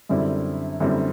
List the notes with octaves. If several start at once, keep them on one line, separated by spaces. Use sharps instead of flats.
F#2 D3 G3 C4 E4
F#2 D3 G3 C4 E4